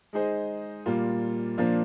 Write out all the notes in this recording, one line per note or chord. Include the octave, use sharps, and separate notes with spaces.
G#3 D#4 G#4 C5 D#5
A#2 G3 A#3 F4
A#2 F3 A#3 D4